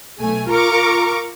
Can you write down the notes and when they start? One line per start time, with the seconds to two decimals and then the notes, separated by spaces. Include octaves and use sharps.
0.20 B1 A3 G#5
0.49 F4 A#4 A#5 C#6 D6